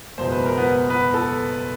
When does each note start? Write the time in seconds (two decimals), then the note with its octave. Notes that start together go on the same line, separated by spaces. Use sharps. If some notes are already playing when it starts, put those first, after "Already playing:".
0.18 F#1 E2 B2 G#3 C5
0.32 B4
0.45 A#4
0.58 B3 B4
0.89 B3 B4
1.14 A4